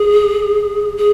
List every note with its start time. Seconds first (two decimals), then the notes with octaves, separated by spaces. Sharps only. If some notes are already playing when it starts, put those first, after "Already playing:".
Already playing: G#4
0.97 G#4